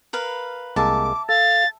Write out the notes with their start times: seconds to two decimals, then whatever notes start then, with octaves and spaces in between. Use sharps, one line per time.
0.13 A#4 B4 F5
0.76 C2 G#3 A#3 E5 A5 D6
1.29 A4 F5 A6